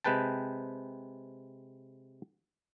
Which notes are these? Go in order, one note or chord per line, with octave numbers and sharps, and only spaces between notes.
C3 G#3 B4 G5 A5